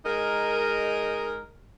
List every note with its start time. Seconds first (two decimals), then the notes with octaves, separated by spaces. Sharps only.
0.05 G#3 D#4 A#4